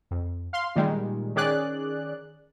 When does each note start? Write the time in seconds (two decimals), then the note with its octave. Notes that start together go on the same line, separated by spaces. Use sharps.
0.11 F2
0.53 F5 C6
0.76 A#2 D#3 G3 G#3
1.36 D#3 C#4 G#4 D5 F#6